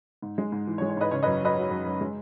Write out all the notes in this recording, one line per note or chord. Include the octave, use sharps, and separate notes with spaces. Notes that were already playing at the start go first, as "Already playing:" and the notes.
G#2
G#3
G#2
E3
C#5
G#3
C#5
G#2 B4 D#5
C#3 C#5
F#2 B4 D#5
F#3 B4 D#5
F#3
F#2
F#2
G#3